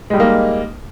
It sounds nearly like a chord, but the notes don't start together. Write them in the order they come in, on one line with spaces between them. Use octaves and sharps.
G#3 G3 D#4 A#3